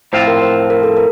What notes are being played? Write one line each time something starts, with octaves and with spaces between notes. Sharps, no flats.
A2 F3 C4 F4 C5
A#4
C5
A#4
A4
A#4